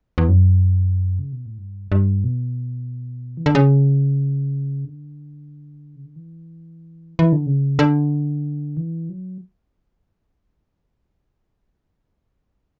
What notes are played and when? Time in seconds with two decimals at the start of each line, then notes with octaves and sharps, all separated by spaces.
0.18 E2
0.29 F#2
1.19 C#3
1.32 B2
1.46 A2
1.58 G2
1.92 G2
2.24 B2
3.37 E3
3.46 D3
3.55 C#3
4.85 D3
5.96 C#3
6.05 D3
6.16 E3
7.19 E3
7.32 D3
7.46 C#3
7.79 D3
8.77 E3
9.09 F#3